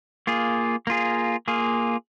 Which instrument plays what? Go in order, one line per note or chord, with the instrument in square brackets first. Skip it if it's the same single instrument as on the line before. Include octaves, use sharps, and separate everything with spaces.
[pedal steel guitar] A#3 F4 G#4
A#3 F4 G#4
A#3 F4 G#4